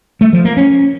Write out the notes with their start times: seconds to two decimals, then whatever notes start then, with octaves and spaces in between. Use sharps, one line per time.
0.21 A3
0.33 F3
0.45 A#3
0.57 C#4